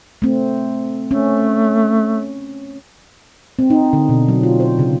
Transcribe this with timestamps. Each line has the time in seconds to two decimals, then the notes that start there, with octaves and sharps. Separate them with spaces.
0.22 A3 C4
1.11 A3 C#4
3.59 C4
3.70 D#4
3.93 D3
4.09 B2
4.28 F#3
4.43 F4
4.60 C5
4.79 C#3